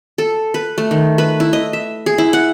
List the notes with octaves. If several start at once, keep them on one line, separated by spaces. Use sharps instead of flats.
A4
B4
A3
D#3
B4
E4
D#5
E5
G#4
E4
F#5